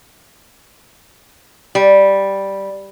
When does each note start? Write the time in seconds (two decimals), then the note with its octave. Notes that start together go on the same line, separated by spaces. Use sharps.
1.75 G3